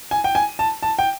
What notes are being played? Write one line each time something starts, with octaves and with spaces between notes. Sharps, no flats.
G#5
G5
G#5
A5
A5
G5